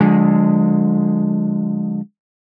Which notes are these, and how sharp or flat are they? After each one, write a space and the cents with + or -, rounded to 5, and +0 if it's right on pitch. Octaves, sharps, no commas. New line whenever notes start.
D3 +0 F3 +45 G#3 +0